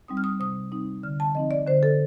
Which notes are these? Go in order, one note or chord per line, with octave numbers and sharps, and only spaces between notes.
G3 C4 D#4 D#6
F6
D#6
C3 D#6
G3 C4 D#4 D#6
D3 F6
A5
F3 C4 D#4 D#5
D5
D3 C5
A4